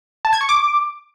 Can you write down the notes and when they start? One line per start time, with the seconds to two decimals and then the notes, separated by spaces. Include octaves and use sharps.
0.25 A5
0.33 G#6
0.41 C#6
0.49 D6